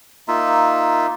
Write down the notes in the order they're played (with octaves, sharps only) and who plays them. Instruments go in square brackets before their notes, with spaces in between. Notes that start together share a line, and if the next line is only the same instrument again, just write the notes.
[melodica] A#3 D#4 F4 E5